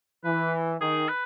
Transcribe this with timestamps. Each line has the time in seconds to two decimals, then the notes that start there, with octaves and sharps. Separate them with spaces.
0.24 E3 B4
0.81 D#3 G#4
1.09 B4